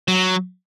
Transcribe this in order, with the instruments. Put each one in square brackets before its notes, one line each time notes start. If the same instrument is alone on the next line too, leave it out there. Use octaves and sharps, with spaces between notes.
[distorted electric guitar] F#3